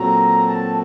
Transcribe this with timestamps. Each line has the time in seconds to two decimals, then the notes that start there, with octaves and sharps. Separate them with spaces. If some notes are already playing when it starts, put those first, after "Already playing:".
Already playing: A#2 F#3 C4 F#4 A4 A#5
0.48 A5